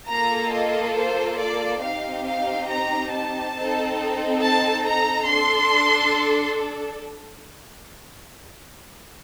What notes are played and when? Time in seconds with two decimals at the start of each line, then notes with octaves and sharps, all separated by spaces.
0.10 A#3 F4 A4 A#5
0.54 D#5
0.97 C5
1.40 D5
1.83 C4 D#4 G4 F5
2.27 F5
2.70 A#5
3.13 A5
3.56 C4 D#4 A4
4.42 A5
4.85 A#5
5.29 D4 A4 C6